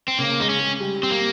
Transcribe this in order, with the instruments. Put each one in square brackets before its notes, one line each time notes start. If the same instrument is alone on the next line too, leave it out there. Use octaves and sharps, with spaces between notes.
[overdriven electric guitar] C4
[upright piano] C#3 [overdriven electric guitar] A#3
[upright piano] G#3 [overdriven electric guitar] D#4
[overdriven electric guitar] C#4
[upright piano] G#3
G3
[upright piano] G3 [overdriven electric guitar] C4
[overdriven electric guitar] A#3